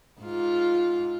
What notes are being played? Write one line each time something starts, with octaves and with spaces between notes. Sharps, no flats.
G#2 F4